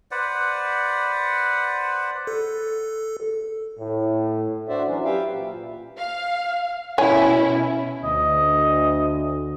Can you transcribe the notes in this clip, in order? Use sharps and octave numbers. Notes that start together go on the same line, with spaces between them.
B4 C5 D5 F#5
A4
A2
D4 F#4 C5 D5 E5
E3 F#3 C#4
G4 B4 E5 F5 G5
A#2
F5
B2 C#4 E4 C#5 G#5
D2 D#5